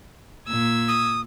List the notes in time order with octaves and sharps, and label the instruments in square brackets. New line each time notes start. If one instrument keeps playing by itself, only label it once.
[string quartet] A#2 E6 G#6
[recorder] D#6